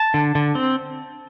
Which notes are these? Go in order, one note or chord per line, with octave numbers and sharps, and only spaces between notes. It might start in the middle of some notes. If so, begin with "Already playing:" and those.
Already playing: A5
D3
D3
C4